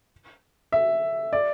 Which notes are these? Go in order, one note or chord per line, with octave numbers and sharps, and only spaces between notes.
E5
D5